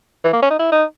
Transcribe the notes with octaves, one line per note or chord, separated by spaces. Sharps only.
E3
A#3
C#4
D#4
E4
D#4